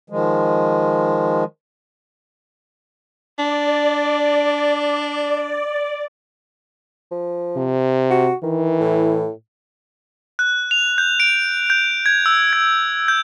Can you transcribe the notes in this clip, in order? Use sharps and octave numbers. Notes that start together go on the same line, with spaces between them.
D#3 F3 G#3
D4 D5
F3
C3
F#4
D#3 E3
A2
F#6
F7
G6
D7
G6
G#6
E6
G#6
G6